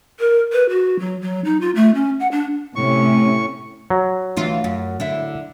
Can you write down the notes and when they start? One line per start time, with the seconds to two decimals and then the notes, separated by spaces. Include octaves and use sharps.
0.20 A#4
0.53 B4
0.70 F#4
1.00 F#3
1.22 F#3
1.45 D#4
1.61 F4
1.76 A3
1.95 C#4
2.20 F#5
2.32 D4
2.76 A2 C3 A3 C#4 C#6
3.90 F#3
4.36 D2 E3 F4
4.64 F#2
5.00 D3 E4